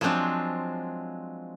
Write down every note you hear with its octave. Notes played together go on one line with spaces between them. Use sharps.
F3 F#3 G#3 C4 D4